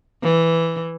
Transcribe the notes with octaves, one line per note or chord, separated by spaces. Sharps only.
E3